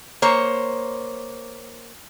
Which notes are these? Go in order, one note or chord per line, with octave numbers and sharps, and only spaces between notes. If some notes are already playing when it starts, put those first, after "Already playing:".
A#3 C5 C#5